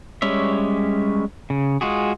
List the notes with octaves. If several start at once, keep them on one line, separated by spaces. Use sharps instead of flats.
G3 G#3 C#4 C#5 E5
C#3
G#3 F4 F#4 G#4